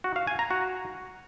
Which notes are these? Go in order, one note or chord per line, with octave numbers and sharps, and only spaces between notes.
F#4
F5
G#5
A#5
F#4